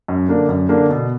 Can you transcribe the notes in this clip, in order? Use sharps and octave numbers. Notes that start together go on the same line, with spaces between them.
F#2
D3 A#3 D4
F#2
D3 A#3 D4
B2